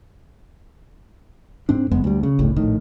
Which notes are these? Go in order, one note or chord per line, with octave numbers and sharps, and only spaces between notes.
G#2 C4 D4
F#1 F2 G#3 B3
D2 G3
C#3
G1 C#2 A2
A#1 A2 D#3